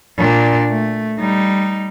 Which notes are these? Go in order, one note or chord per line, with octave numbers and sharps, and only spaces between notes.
A#2 D4
A3
G3 D#4